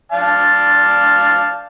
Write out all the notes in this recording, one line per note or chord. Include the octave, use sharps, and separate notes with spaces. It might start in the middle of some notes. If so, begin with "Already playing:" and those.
D5 F5 A5